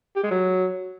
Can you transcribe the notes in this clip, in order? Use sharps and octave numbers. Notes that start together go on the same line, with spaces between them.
G4
G#3
F#3